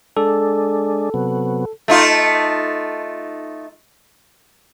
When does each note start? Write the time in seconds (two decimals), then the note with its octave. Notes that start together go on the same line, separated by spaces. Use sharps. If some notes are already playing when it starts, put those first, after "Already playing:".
0.17 G#3 D4 A4
1.14 C3 F#3 B3
1.88 A3 D#4 F4